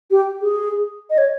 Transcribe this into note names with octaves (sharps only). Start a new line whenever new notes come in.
G4
G#4
D#5
C#5